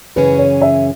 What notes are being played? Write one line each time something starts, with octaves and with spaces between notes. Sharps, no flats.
F#2 C#3 E3 C#4 G#4 B4
C#5
E5